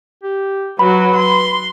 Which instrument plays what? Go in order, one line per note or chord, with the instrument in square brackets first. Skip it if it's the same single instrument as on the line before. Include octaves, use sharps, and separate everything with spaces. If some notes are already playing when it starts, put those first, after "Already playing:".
[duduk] G4
[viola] F#3 F#4 [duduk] B4 [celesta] B5
[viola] C6